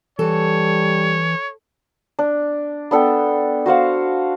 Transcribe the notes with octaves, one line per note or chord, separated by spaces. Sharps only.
E3 G3 A4 C#5
D4
B3 D4 A4 G5
F#4 C5 F5 F#5